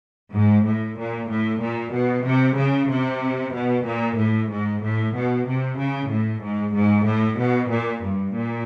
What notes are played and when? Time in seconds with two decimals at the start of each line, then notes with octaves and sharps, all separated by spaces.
0.34 G#2
0.65 A2
0.98 A#2
1.30 A2
1.62 A#2
1.93 B2
2.25 C3
2.58 C#3
2.90 C3
3.54 B2
3.85 A#2
4.18 A2
4.50 G#2
4.82 A2
5.14 B2
5.47 C3
5.78 C#3
6.10 A2
6.42 G#2
6.75 G#2
7.06 A2
7.39 B2
7.70 A#2
8.03 G2
8.35 A#2